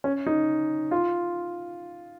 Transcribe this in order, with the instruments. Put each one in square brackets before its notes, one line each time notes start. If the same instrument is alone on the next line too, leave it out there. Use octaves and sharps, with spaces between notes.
[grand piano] C#4
D#4
F4